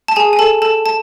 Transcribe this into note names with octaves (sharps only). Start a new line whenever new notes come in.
A5
G#4 G#5
G#5
A4 A5
A4 A5
A5